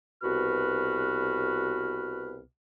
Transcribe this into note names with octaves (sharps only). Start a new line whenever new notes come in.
C2 B2 F#4 B4 F6